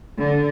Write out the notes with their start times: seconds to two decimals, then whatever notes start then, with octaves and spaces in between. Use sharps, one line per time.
0.19 D3